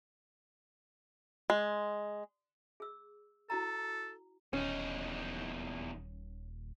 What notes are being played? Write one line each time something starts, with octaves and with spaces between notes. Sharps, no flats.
G#3
G#4 E6
E4 F#4 A4 A#5
D#1 E2 C#4 D#4